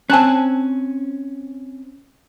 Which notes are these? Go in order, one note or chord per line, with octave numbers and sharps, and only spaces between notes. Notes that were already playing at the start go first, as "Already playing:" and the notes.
C4 C#4 G#5 A5 F#6